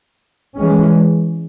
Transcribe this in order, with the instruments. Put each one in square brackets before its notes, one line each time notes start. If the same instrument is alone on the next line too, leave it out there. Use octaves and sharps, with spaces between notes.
[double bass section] E3 G#3 C#4